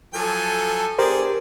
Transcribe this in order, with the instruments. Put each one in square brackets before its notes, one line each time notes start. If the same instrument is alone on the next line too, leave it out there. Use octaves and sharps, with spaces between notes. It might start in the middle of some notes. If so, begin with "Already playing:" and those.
[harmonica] F3 F#3 G#5 [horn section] A4
[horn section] B3 D4 G#4 [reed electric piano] G4 A#4 C5 [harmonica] D5